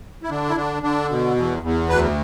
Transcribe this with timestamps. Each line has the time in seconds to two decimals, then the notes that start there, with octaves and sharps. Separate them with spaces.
0.23 E4
0.30 D3 D4
0.49 E4
0.56 D3 D4
0.83 D3 D4
1.09 B2
1.36 E2
1.63 E2
1.89 D2 B4